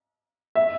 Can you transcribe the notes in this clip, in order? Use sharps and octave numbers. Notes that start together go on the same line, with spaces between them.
E5